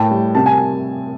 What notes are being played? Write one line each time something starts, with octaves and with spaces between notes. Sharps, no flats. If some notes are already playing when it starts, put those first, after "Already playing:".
Already playing: A2 G5 A5
G3
C3 A5
G#5